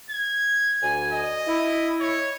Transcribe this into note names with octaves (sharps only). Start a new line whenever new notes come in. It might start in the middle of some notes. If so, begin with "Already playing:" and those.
G#6
D2 G#5
D#5
E4
C#5